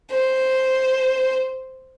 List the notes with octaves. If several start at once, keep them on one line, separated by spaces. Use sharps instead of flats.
C5